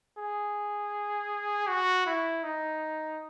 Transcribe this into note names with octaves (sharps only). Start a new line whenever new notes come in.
G#4
F#4
E4
D#4